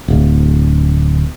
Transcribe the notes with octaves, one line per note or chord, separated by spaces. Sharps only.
D1